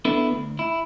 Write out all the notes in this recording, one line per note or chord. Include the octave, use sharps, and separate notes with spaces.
B3 D4 E4 A4 B4
D2
E4